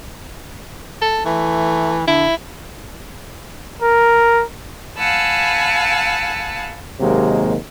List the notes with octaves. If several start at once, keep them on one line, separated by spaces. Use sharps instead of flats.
A4
E3 A3
D3 E4
A#4
F5 F#5 G#5 A5 B5 E6
D#2 C3 F#3 G#3 A#3